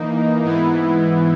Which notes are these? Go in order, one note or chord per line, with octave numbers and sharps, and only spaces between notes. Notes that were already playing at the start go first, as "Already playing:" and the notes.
Already playing: E3 A#3 D#4
G#2 E3 B3 E4